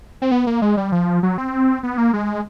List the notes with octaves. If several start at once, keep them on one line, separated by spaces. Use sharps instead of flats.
C4
B3
A#3
G#3
G3
F3
F#3
C4
B3
A#3
G#3